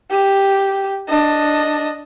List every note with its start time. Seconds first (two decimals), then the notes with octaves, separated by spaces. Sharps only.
0.11 G4
1.08 D4 D#5